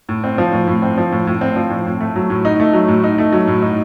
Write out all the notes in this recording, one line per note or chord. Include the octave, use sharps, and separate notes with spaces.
A2
C4
F3
A2
A2
C4
F3
A2
A2
C4
F3
A2
A2
A3
F#3
A2
D#4
A3
F#3
A2
D#4
A3
F#3
A2
D#4